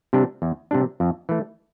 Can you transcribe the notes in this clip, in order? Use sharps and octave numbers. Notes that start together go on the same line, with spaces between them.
C3 G3 D4
E2
C3 G3 D4
F2
E3 A3